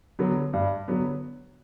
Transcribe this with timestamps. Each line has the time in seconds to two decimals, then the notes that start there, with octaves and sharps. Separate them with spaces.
0.19 D3 F#3 B3
0.53 G2
0.88 D3 F#3 B3